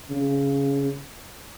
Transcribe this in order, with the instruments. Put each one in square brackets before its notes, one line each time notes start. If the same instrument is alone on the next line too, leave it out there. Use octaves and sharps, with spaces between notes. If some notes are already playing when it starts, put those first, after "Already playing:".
[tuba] C#3